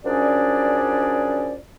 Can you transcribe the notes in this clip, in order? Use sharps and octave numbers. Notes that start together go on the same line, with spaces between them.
F#2 F3 C#4 D4 G#4 D5